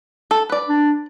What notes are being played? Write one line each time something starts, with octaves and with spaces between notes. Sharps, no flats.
A4
B4 D5
D4